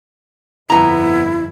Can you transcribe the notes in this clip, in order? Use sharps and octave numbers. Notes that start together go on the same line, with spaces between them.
G1 F2 B3 E4 A#5